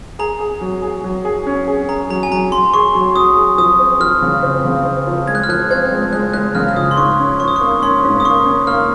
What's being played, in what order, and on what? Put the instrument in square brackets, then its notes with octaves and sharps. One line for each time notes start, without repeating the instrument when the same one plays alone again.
[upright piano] G#4 [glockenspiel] A#5
[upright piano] G#4
F#3
G#4
F#3
G#4
C#4
G#4
[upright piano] G#4 [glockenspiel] A#5
[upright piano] F#3 [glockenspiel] A#5
[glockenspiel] G#5
[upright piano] F#3 [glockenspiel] A#5
[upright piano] F#3 [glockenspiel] C6
[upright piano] G#4 [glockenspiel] C#6
[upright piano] F#3
[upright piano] F#3 [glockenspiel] D#6
[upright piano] G#4
[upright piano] F3 [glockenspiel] D#6
[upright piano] C4
[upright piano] F3 [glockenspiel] F6
[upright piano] C#3
C4
C#3
C4
F3
[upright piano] G#3 [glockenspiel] G#6
[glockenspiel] F#6
F6
[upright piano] F3 [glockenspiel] F#6
[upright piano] C4 [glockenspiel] G#6
[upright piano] G#3
[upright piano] G#3 [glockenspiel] F#6
[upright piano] G#3 [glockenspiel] F#6
[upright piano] C#3 [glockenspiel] F6
[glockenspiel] F6
[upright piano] F3 [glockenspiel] D#6
[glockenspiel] C6
[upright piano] G#2 [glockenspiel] C#6
[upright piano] C#4
[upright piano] F3 [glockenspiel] C#6
[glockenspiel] D#6
C#6
[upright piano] A#3
[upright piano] C#4 [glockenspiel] C6
[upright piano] G#2
[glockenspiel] D#6
[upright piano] A#3 [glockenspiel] C#6
[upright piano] C#4
[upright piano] A#3 [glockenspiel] F6